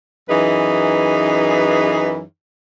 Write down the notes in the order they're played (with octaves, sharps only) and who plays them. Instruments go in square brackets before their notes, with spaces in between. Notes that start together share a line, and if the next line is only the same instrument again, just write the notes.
[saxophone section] F#2 E3 D#4 G#4 B4